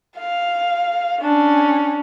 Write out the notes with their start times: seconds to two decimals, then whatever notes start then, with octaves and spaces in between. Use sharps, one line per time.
0.17 F5
1.21 C#4 D4